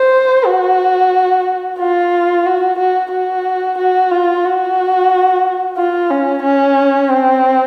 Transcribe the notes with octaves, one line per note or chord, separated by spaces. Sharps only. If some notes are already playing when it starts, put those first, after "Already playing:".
Already playing: C5
F#4
F4
F#4
F#4
F#4
F#4
F4
F#4
F4
C#4
C#4
C4